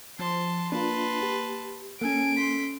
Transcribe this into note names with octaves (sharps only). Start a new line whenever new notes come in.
F3 A5 C6
A#3 D4 F4 B4 A5 C6
G4
A#3 C#4 A4 G#5 D7
C6 B6